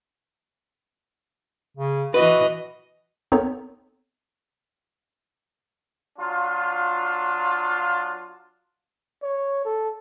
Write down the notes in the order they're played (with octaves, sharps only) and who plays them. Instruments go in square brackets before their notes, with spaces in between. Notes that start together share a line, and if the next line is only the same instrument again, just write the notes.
[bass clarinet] C#3
[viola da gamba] E3 D#5 [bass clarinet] F#4 [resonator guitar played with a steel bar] B4
[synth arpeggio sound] B3 C4 D#4 A4 A#4 C#5
[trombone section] F#3 D4 F4
[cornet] C#5
A4